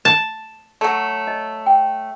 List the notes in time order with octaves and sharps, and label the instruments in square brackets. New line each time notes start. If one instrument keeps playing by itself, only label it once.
[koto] A5
[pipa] F#3 A3
[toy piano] D#5
G5